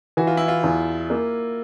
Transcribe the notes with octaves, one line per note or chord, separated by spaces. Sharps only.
E3 F#4
F4
E4
F4
E2
A#3